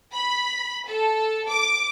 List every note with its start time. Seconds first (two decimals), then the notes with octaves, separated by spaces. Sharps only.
0.13 B5
0.88 A4
1.49 D6